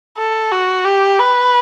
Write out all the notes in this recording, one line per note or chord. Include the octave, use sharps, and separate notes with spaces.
A4
F#4
G4
B4